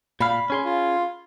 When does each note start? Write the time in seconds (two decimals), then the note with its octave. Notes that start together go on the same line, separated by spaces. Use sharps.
0.20 A#2 F5 B5
0.50 C#4 G#4 C6
0.65 F4